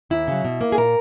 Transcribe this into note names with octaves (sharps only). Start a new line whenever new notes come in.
D#2 E4
C#3 F#3
B2
A#3
G#4
A#2 A#4